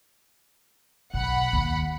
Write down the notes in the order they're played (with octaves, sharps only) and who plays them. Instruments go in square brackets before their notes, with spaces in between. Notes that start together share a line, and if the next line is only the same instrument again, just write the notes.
[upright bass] B1 [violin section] F#5 B5
[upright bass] D#2